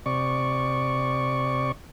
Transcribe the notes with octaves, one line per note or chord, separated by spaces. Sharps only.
C3 D5 C#6